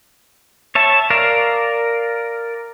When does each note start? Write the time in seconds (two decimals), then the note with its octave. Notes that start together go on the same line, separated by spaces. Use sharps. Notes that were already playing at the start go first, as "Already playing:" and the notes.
0.75 C#5 E5 A5
1.10 A#4 D5 F5